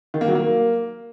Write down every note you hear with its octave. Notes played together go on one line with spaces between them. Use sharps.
D#3
A#3
F#3
A#3